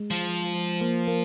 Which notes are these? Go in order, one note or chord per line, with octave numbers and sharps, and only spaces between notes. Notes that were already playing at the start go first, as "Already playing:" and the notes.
Already playing: G#3
F3
A#3
A#3